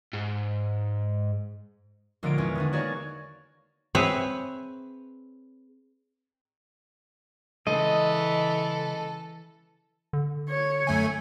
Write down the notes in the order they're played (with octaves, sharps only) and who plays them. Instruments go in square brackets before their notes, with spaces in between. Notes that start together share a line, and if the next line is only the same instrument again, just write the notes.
[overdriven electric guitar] G#2
[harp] A#1 D3 G#3 C#4 A#4 D7
E2 C#4
D#3 B3 D4
A#3 F#4 G#4 C#5 D5
[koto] C4 G#4 B4 C#5 E5
[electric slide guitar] C#3 G#3 [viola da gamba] E3 [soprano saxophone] A4 [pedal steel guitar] D#5
[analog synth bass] D3
[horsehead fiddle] C#5
[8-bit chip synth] F#2 A3 G#5